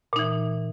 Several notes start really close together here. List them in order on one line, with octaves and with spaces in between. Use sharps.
A#2 D#4 E3